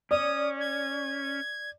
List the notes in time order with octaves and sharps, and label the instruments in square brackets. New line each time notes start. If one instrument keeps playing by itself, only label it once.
[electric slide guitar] C#4 [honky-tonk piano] D5 [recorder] D#6
[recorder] G#6